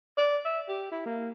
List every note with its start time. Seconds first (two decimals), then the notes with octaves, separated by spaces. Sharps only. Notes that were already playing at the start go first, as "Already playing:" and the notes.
0.17 D5
0.45 E5
0.69 G4
0.92 E4
1.06 A#3